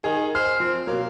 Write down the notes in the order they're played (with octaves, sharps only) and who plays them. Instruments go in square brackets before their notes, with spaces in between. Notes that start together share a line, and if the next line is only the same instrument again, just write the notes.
[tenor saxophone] D#3 [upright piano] G#4 G#5
[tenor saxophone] C5 [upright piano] F6
[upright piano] F3 [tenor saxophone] C4
[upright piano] B2 F#3 [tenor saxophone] A#3